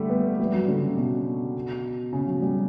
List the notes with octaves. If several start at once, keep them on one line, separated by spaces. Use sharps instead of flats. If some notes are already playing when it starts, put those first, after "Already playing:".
Already playing: D3 G3 A3
B3
G3
F#3
D3
C#3
B2
C#3
F#3
G3